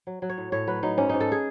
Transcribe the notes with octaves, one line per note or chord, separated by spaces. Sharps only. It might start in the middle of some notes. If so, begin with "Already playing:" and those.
F#3
F#3
C#5
A2
A2 C#5
F#3 B4
F#3 D#4
G#2 C#4
G#2 D#4
A4
G#4